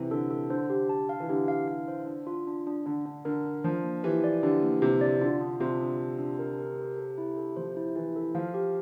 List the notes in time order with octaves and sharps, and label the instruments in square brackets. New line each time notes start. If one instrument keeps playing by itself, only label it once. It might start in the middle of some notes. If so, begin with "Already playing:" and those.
Already playing: [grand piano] C3 E3
[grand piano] D3 [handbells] A4
[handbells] A4
[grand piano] D3 [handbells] C5
[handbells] G4
A5
F5
[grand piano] E3
[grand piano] D3 [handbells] G4
[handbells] F5
F5
C5
D4
F4
D4
D4
[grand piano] D3 [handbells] D4
[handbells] D4
[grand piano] D3 [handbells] A#4
[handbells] D4
[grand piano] F3 [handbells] D4
[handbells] A#3
[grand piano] E3 [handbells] G4
[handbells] D5
[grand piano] D3 [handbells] G4
[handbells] A#3
[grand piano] C3 [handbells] G4
[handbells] D5
[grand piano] D3 [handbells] F4
[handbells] D4
[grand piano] C3 [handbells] F4
[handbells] D4
F4
D4
A#4
A#4
A4
A4
E4
A4
[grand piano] F3 [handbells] C5
[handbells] E4
[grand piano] E3 [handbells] E4
[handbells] A4
[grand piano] F3 [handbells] F5
[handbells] G4